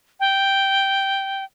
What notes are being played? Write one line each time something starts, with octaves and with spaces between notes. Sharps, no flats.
G5